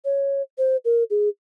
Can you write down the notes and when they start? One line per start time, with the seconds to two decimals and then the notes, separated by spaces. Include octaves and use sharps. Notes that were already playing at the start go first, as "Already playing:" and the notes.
0.05 C#5
0.58 C5
0.85 A#4
1.10 G#4